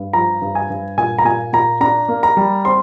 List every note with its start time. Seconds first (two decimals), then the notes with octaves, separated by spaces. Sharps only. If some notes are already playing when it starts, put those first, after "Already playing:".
Already playing: G2
0.13 F3 A#5
0.42 G2
0.55 G#5
0.70 G2
0.97 A#2 G#5
1.18 A#5
1.25 A#2 G#5
1.53 A#2 A#5
1.80 D4 A#5
2.08 A#3
2.23 A#5
2.37 G3
2.65 C4 C6